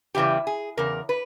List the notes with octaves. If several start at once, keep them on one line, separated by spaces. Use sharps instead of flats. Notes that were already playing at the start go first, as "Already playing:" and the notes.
E2 C#3 E3 G3 G4
G#4
E2 C#3 A#4
B4